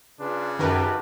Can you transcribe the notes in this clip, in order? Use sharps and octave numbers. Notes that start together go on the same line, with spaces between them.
C#3 D4 F4 B4
F#2 D#3 F#4 G4 A#4 B4 A5